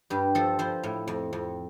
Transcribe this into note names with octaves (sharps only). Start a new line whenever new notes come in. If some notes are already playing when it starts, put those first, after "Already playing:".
G2 G4
F3 A4
F3 C5
A2
F2
F2